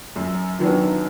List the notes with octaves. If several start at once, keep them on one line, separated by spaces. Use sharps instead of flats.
F#2
D#3 F#3 B3 D4